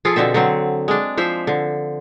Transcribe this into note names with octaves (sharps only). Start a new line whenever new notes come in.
F3 F4 G#4 A4
B2 D3 C4 E5
D3 F#3 C4
G#3 D4
F3 C5 E5
D3